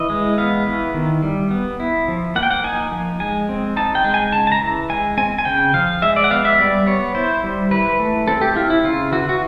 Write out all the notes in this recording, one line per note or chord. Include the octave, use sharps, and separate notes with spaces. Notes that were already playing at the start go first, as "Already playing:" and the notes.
Already playing: E3 D#5
G#3
B3 F5
E3
D#3
G3
B3
E4
F3
A#3 F#5
G5
F#5
D#4 G#5
F3
G#3 G#5
C4
D#4 A5
G5
G#3
G#5
C#3 A5
A5
A#5
E3
G#3 G#5
C4 G#5
G#5
C#3 G5
F3 F5
G#3 E5
D5
F#5
B3 F5
E5
G3 D5
B3 C#5
E4 C5
G3
E3 B4
A3
C4 A4
G4
E4 F4
E4
C#3 F4
E3 F#4
F#4